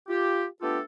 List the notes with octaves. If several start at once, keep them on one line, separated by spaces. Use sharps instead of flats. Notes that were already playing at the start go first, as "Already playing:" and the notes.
F4 G4
A3 B3 D4 F4 G4 A4